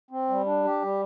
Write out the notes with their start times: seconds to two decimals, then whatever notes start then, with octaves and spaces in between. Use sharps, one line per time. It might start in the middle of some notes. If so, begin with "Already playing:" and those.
0.11 C4
0.29 G3
0.46 D4
0.65 G4
0.82 G3